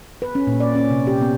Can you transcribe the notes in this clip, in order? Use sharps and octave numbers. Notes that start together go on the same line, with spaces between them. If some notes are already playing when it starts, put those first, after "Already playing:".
B4
C#4
A#2
D5
C#4
C3
G4
B3